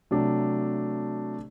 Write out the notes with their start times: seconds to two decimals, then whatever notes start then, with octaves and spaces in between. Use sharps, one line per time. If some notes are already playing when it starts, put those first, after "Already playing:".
0.11 C3 F#3 A3 D4